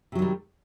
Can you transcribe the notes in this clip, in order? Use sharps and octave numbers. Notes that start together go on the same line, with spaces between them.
C3 D#3 F#3 G3